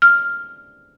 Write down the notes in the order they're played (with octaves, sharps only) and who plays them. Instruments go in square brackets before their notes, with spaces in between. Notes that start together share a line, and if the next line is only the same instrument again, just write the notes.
[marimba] F6